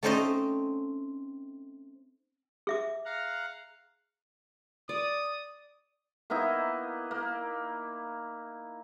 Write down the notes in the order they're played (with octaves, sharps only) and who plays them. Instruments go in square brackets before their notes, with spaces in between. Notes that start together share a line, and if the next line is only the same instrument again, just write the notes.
[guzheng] A3 C4 C#4 D#4 C5 D#5
[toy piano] G#4 E5 D6
[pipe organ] F5 F#5 A#5
[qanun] D5 [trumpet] D#6
[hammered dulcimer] A#3 B3 D#4 E4
A#3